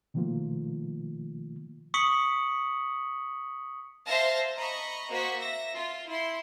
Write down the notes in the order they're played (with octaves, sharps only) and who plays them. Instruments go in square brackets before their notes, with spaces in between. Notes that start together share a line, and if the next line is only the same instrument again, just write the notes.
[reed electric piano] B2 D#3 F3 A3 A#3 F4
[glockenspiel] C#6 D#6 B6 C#7 F#7
[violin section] C5 E5 F5 A5 A#6
D#5 A#5 B5 C#6
A#3 F#4 C5 C#6 B6
E5 A#6
F4
E4 C6